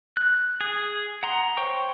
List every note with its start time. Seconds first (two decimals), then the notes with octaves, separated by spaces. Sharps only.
0.17 F#6
0.61 G#4
1.23 F#5 A#5 C6
1.57 C5 C#5 G5 C#6